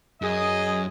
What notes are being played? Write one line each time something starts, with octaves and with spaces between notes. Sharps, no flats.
F#2 G#4 D#5